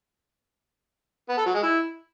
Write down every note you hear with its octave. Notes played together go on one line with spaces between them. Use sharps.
B3
A4
F#3
G#3
E4